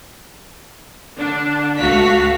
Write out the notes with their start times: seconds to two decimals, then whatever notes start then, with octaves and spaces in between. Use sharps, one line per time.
1.17 D3 D4
1.77 C#2 A3 F#4 F5 A5 B6